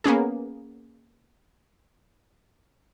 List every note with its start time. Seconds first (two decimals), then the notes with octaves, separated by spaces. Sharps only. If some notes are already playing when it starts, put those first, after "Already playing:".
0.04 A#3 B3 C#4 G#4